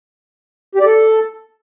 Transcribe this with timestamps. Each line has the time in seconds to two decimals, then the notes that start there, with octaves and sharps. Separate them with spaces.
0.75 G4
0.80 D5
0.86 A4